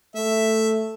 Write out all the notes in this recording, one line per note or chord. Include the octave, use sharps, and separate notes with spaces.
A3 E5